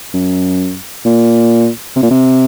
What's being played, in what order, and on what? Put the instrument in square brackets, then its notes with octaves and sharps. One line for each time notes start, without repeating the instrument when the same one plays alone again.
[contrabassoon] F#2
A#2
C3
A#2
C3